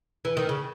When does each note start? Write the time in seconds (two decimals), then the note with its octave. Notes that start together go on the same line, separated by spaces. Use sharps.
0.25 E3
0.37 D#3
0.49 C#3